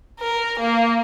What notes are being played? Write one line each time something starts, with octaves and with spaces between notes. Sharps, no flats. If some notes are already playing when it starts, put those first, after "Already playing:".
A#4
A#3